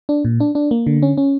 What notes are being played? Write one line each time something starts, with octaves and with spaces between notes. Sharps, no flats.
D4
A#2
D4
D4
A#3
D3
C#4
C#4